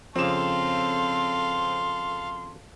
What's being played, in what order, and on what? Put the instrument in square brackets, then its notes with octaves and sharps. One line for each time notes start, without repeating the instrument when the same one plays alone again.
[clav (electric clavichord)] F2 C#3 [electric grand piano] C4 E7 [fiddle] A4 F5 [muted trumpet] C6